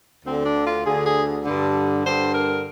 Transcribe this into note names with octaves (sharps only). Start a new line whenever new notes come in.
D2 D3 C4
D4
F4
D2 D3 G#4
G#4
G2 D3
G2 D3 C5
A#4